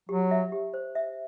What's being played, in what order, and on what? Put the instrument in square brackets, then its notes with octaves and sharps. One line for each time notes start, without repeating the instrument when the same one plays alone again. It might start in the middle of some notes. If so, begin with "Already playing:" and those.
[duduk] F#3 [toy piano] G4
[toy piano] E5
G4
C5
E5